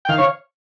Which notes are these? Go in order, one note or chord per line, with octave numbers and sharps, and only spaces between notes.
G5
D#3 F5
C#5